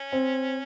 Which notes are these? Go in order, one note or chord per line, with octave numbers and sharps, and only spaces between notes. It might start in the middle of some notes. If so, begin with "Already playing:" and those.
Already playing: C#4
C4